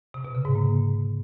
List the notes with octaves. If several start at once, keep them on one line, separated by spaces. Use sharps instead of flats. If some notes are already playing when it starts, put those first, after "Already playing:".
C3
B2
C#3
G#2
A#3